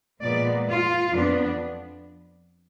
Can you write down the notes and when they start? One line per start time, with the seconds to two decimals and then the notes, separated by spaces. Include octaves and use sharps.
0.22 A#2 F3 G#3 B3 D5
0.67 F4
1.13 F2 F3 B3 D4